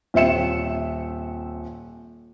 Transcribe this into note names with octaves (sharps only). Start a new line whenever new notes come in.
D#1 C4 E5 C#7 E7